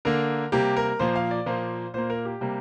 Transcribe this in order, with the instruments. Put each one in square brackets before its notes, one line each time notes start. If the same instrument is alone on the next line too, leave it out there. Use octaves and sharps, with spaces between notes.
[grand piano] D3 A#3 A#4
C3 G3 A#3 G4
A#4
A#2 F3 A#3 C5
F5
D5
A#2 F3 A#3 C5
A#2 A#3 C5
A#4
G4
C3 G3 A#3